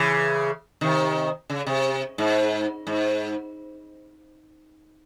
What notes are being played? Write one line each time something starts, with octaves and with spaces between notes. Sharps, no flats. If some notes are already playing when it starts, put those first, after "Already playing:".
Already playing: C#3 E3
C3 D#3
C#3
C3
G#2
G#2